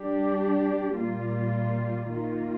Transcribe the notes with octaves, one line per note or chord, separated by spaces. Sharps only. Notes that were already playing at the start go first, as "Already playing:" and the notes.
Already playing: G3 D4 G4
A#2 G3 A#3 F4
D#3 A#3 F4